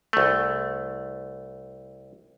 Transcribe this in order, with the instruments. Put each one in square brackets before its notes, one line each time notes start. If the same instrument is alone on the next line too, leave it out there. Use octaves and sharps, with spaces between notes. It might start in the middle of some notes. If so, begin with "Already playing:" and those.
[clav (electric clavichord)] C2 A3